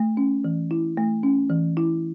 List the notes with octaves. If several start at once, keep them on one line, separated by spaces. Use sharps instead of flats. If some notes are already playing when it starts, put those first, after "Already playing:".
Already playing: A3
C#4
E3
E4
A3
C#4
E3
E4